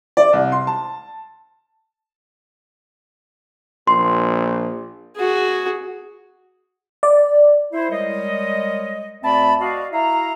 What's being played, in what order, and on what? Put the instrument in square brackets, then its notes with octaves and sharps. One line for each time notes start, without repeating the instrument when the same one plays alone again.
[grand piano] D5
C2
C6
A5
[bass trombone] A#1 [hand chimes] C6
[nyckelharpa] F#4 G#4
[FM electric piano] D5
[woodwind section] E4 C5
G3 G#3 A#4 C#5 D#5
D2 C4 D5 E5 A5 B5
F#4 D5 D#5 F5
E4 F#4 E5 F5 A#5